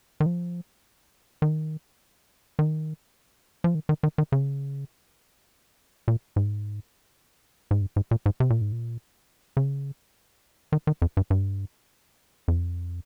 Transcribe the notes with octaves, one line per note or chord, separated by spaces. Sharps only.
D#3
F3
D#3
D#3
F3
D#3
D#3
D#3
D#3
C#3
A#2
G#2
G#2
G2
G#2
A#2
G#2
C3
A#2
G#2
A#2
C#3
D#3
D#3
F2
G2
G2
F2